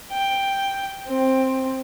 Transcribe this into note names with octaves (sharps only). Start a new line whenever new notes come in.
G5
C4